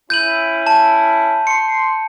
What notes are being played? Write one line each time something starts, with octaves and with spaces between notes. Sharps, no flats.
C#4 E4 G6 D#7 F#7
A5
C6 C#7